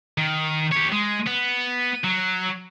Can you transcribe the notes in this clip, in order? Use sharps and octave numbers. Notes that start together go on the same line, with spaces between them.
D#3
G4 C#5
G#3
B3
F#3